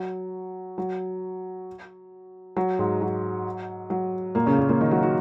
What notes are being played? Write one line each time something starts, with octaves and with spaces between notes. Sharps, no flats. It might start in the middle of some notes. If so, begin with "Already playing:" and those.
Already playing: F#3
F#3
F#3
G#2 G#3
F#3
F#3
A#2 A#3
C#3 C#4
A#2 A#3
A#2 A#3
D#3 D#4
F#3 F#4
F#3 F#4